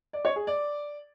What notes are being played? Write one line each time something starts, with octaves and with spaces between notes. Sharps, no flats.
D5
C#5
G#4
D5